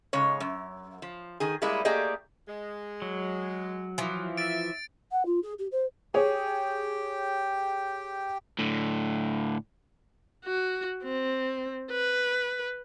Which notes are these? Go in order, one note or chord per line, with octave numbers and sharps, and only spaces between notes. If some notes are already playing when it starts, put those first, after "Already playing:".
G#2 C#3 G#3 C#5
F#2
F3
D#3 G#4
G3 G#3 A#3 E4 G#4
A3 A#3 G4 G#4 D5 D#5
G#3
F#3
E3 F3
E5 A6 D7
F#5
F4
G#4
G4
C5
G4 G#4 C#5 G5
A2 D3
F#4
C4
B4